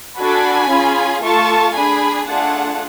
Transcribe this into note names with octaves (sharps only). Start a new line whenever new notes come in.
D4 F#4 A4 G#5 B5
C#4 F4 G#4
A3 F4 A4 A5 C#6
D4 G#4 G#5 B5
A3 D4 F4 G#4 F#5 A5